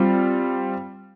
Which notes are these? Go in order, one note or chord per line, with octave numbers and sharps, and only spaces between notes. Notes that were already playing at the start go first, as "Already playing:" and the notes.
Already playing: G3 C4 F4